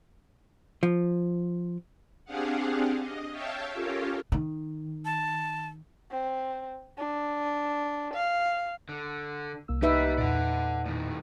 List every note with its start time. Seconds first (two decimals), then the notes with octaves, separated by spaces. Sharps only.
0.83 F3
2.25 C4 D4 G4 G#4 F5 F#5
2.98 D#5
3.30 C#5 E5 F5 G5 A5
3.73 C#4 F4 G4 A4 A#4 C#5
4.32 D#3
5.05 A5
6.11 C4
6.98 D4
8.13 F5
8.89 D3
9.68 C2 A#3 E6
9.82 D#4 G4 B4 D5 E5
10.18 E2 A#2 D5 F#5
10.86 A2 D#3